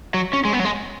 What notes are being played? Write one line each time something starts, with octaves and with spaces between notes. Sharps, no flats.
F#3
C#4
G#3
B3
F#3
G#3